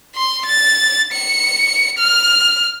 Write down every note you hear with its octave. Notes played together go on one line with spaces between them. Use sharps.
C6
A6
C#7
F6